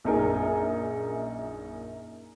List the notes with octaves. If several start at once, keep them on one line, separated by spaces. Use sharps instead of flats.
A#1 F#2 D#4 G#4 A#4 G#5